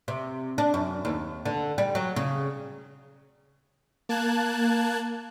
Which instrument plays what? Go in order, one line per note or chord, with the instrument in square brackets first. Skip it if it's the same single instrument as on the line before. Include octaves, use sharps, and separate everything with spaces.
[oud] C3
D4
F#2
D#2
D3
G3
F#3
C#3
[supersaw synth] A#3 A5 F#6 G#6